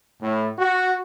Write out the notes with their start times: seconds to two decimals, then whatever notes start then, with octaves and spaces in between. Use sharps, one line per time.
0.22 A2
0.59 F#4